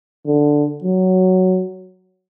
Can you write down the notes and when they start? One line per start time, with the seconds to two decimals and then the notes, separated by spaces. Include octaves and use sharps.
0.26 D3
0.84 F#3